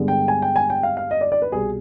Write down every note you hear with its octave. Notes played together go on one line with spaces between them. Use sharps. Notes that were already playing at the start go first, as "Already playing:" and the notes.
Already playing: G2 D3 G#3 B3
G5
G#5
G5
G#5
G5
F5
F5
D#5
D5
D5
B4
C2 B2 G3 G#4